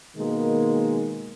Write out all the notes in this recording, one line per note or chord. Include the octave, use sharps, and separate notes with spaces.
B2 D#3 G#3 A#3